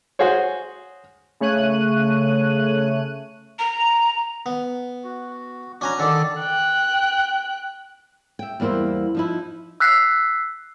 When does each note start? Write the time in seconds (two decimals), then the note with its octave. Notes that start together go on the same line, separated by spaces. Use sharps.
0.19 F#4 G#4 C5 C#5
1.40 C#3 A3 C#5 F#6 D#7
3.59 A#5
4.46 B3
5.04 F#4
5.81 C#4 D4 F#4 G#5 A#5
5.99 D3 D#3 A4 D5
6.40 G5 F#6
8.39 E5 G5
8.60 E2 G3 A#3 E4 C5
9.15 F3 D#4 E4
9.80 E6 F#6 B6 C7